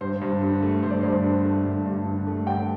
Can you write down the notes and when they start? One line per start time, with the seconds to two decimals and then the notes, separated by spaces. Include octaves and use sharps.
0.01 G2 C5
0.21 G2
0.42 D3
0.62 A3
0.83 G2 C5
0.91 D5
1.00 G2 C5
1.24 D3
1.45 A3
1.65 G2
1.86 G2
2.05 D3
2.27 A3
2.46 G2 G5